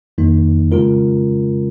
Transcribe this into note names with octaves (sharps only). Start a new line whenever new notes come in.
F2 D#3 A#3 D#4
C#3 G#3 C#4 F4 A#4